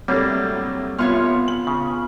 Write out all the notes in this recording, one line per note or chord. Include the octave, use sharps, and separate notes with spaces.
A2 C3 F#3 G3 A#3 D4
C2 B3 F4 C#5 C6 F6
F#7
C#3